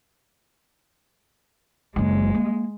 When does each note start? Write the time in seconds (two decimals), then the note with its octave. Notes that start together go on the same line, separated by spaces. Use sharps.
1.96 F#1 F#2 G#3
2.35 A#3